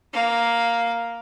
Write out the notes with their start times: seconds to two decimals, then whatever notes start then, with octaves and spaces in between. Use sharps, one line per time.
0.13 A#3 F5